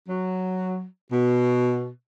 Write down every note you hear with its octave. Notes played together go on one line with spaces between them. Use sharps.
F#3
B2